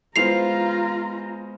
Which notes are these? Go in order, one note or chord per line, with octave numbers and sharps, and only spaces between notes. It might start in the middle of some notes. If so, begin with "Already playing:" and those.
G#3 B3 F4 C5 A#5 C7 F7